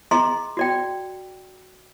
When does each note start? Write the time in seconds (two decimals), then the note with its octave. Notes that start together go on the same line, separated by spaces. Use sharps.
0.11 G#4 D#5 A#5 C6
0.57 F#4 D5 G5